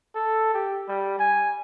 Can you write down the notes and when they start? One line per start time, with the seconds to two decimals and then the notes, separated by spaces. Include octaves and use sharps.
0.15 A4
0.54 G4
0.88 G3
1.19 G#5